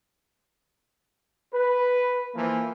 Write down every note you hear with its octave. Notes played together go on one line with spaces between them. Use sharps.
B4
E3 F3 A#3